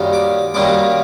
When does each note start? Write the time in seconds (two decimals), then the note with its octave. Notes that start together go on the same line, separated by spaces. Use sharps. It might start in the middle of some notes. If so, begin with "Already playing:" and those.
Already playing: F#2 D#3 G3 A#3
0.13 D6
0.54 F#2 D#3 G3 A#3 D6